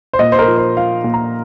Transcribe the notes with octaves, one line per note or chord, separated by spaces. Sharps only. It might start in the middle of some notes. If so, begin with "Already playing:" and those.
C5
A#2 D#5
C5
A#4
F3
C5
F3 F5
A#2
A#5